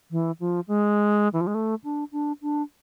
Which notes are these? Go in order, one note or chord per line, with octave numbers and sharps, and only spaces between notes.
E3
F3
G#3
E3
F3
G#3
A3
D4
D4
D4